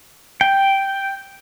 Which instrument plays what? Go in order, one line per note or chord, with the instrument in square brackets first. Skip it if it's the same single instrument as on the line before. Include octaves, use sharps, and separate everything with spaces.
[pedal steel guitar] G5